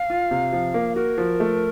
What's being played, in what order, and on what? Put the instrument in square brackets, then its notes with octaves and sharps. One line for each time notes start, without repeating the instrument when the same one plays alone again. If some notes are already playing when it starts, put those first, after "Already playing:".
Already playing: [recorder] F5
[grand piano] F4
C3
F3
A#3
[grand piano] F#4 [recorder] A#4
[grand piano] F3
A3